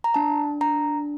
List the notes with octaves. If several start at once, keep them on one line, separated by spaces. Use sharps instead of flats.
A#5
D4 A5
D4 A#5